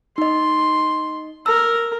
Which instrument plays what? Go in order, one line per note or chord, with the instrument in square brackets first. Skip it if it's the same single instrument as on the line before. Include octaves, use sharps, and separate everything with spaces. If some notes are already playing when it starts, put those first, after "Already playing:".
[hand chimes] D#4 D#5 [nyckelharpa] C6
[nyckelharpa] A#4 [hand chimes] E6